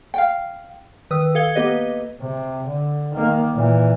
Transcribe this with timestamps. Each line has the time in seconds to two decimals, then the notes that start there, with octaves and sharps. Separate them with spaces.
0.14 F5 G5
1.11 D#3 B4 D#6 E6
1.35 A4 F5 G#6 G7
1.55 A#3 B3 G4 B4 D#5
2.20 C3
2.68 D3
3.14 D#3 A#3
3.54 A#2 E3